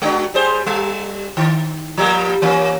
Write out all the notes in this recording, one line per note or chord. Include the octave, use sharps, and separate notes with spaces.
G#3 D4 F#4
G3 G#4 C5
G3
D#3
F3 G3 A#3
E3 A#3 C#4